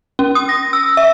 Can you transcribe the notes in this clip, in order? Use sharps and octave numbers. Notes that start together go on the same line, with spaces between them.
C#4
D#6
A#6
E6
E5